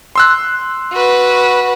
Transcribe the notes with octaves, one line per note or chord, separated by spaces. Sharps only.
C6 E6 F#6
F#4 B4